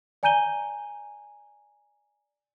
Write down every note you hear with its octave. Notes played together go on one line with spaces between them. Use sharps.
D5 G#5 A#5 G6 D#7 G7